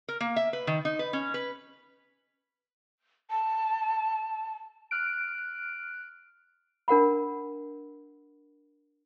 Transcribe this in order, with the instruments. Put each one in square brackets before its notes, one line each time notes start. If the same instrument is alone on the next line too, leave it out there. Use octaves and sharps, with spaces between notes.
[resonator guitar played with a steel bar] A#4
A#3
E5
B4
D#3
D#4
B4
C#4
B4
[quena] A5
[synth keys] F6 F#6 D7
[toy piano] D4 A#4 F#5 B5